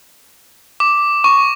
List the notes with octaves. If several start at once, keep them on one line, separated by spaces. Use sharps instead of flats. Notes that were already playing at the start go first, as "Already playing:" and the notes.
D6
C#6